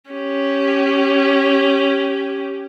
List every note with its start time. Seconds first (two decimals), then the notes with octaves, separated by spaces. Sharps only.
0.10 C#4 G4